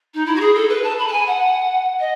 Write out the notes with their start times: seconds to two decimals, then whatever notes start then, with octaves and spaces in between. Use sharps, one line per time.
0.14 D#4
0.26 E4
0.36 F#4
0.40 G#4
0.55 A4
0.69 B4
0.83 A5
0.98 B5
1.07 A5
1.12 G#5
1.27 F#5
1.99 D#5